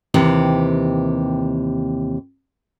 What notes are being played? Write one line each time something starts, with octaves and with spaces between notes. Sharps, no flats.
D#2 C3 E3 G4